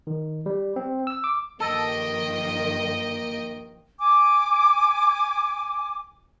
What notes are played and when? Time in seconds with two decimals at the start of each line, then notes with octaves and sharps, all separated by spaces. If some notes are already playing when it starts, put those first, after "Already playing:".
0.07 D#3
0.46 G3
0.76 C4
1.07 E6
1.24 D6
1.60 G2 D#3 F3 A#3 A4 D#5 G5
3.99 G#5 D6